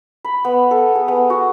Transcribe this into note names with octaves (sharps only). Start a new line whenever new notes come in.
B5
B3
A4
G#4
B3
F#4